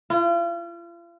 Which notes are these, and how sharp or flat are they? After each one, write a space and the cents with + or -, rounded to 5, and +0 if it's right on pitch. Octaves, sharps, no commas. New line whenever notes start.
F4 -40